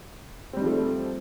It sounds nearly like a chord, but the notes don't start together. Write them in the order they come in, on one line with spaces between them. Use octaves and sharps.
C4 G3 D#4 F3 A3